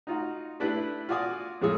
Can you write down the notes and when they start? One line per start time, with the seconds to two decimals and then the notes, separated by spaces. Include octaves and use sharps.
0.07 D#4 F4 F#4
0.60 A3 D4 E4 G4 B4
1.09 F4 F#4 D5 G#5 D#6
1.61 F2 A2 G#3 F4 G#4 E6